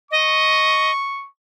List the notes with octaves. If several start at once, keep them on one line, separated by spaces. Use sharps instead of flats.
D#5 C#6